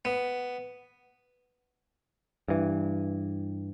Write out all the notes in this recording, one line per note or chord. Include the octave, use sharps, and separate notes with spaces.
B3
G2 E3